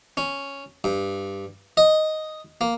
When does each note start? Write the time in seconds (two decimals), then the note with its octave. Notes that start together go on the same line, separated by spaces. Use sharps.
0.17 C#4
0.84 G2
1.77 D#5
2.61 A#3